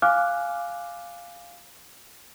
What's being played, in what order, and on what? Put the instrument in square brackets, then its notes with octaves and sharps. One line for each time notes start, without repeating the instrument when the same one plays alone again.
[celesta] F5 G#5 D6 F6 F#6